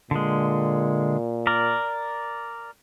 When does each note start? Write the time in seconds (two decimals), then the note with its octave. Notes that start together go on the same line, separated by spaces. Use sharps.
0.11 A#2 D3 G#3
1.47 A#4 D5